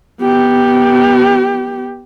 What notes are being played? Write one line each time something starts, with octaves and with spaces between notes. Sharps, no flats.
B3 G4